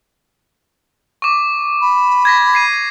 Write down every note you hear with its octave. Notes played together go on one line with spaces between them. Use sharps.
C#6 D6
B5
G#6 A#6 B6
G#6 C7 D#7